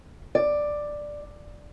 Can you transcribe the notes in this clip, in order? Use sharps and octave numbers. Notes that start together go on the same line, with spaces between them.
D5